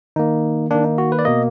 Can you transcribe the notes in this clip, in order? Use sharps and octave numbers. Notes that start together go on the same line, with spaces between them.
D#3 A#3 D#4
D#3 A#3 D4
D#4
F#4
B4
D5
B2 A#3 D#5